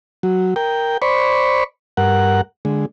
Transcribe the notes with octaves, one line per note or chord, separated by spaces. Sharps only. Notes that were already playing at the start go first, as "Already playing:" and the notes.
F#3
A#4 G5
C5 D5 B5 C#6
G2 A#4 F#5
D3 G#3